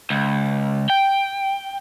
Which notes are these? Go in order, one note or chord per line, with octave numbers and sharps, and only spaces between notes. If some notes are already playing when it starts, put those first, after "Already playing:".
C#2
G5